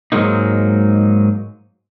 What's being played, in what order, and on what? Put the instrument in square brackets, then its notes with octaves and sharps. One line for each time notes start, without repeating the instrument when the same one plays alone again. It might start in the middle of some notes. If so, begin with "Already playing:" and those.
[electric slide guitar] G#2 F#3 G#3 A#3 D#4